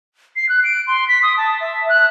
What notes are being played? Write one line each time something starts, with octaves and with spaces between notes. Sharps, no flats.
C7
F#6
D7
C6
B6
D#6
A5
E5
F#6